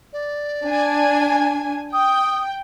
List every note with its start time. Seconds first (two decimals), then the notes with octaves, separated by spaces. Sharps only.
0.13 D5
0.64 D4 G#5
1.93 G5 D#6